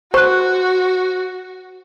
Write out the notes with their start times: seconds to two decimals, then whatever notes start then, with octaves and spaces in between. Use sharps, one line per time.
0.14 F#4 C5 C#6 F#6